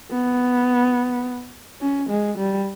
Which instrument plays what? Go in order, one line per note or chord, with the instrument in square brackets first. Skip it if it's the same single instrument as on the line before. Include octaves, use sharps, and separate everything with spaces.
[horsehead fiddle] B3
C#4
G#3
G3